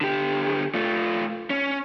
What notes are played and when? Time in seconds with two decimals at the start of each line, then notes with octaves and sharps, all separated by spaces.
0.01 D3 G4
0.75 A3 F4
1.50 C#4